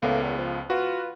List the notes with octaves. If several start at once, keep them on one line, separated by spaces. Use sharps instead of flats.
C#2 A2 A#3 B3
E2
F3
F4 F#4 B4